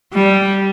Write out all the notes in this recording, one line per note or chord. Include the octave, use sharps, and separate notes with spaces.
G3